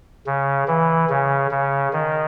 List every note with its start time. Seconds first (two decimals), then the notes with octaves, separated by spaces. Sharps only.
0.27 C#3
0.68 E3
1.10 C#3
1.51 C#3
1.93 D#3